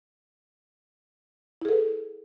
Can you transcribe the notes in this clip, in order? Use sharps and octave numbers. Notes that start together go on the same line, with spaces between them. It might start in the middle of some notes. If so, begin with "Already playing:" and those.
E4 G#4 A4 B4